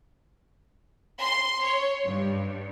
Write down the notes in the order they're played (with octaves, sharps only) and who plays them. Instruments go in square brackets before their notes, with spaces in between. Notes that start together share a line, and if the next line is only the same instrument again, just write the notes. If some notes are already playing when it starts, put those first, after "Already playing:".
[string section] C6
C#5
G2